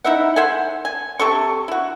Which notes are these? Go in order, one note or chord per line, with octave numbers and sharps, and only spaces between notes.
D#4 E4 E5 F#5
C5 E5 F#5 G#5
G#5
C3 A4 C#6
E4 F#4